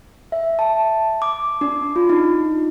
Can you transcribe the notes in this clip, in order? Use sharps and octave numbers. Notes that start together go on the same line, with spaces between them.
E5
A5
D6
D4
F4
D#4